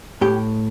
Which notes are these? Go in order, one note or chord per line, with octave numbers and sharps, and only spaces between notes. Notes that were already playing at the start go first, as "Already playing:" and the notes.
A2 G4